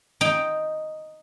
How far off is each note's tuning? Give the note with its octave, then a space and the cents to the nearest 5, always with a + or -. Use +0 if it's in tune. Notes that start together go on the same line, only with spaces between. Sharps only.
D#4 +0 G5 +0